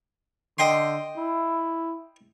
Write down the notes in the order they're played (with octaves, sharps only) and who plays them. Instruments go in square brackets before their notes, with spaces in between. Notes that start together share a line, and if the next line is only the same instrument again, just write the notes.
[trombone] D3 [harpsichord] D#5 G5 C6
[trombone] E4